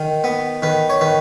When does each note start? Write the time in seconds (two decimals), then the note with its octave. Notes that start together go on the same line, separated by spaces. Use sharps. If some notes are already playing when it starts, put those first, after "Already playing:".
Already playing: D#3
0.24 B3
0.62 D#3 B4
0.90 C#5
1.01 D#3 B4